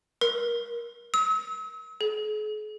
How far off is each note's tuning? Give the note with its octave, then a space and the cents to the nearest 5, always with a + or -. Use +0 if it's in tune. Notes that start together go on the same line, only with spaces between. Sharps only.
A#4 +20
E6 -40
G#4 +45